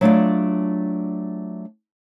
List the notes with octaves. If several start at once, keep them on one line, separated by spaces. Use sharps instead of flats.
F#3 A3 D4 F4 G#4 D5